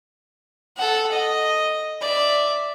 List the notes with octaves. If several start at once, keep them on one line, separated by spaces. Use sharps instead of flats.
A4 F#5
D#5
D5 E5